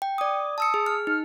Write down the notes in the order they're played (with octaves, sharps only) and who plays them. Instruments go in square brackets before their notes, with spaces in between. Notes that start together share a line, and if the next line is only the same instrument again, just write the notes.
[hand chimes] G5
[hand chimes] D5 D#6 [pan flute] D6
[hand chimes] A5 E6 C#7 [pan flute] D#6
[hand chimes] G#4
F6
[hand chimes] D#4 [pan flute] F6